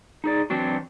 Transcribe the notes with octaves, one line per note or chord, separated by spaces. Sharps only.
D#4 G#4 D5
E3 F#3 C4 D4 F#4